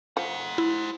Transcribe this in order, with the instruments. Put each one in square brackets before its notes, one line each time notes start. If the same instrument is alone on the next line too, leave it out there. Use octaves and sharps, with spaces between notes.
[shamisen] F3 [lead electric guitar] C5 F#5
[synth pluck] E4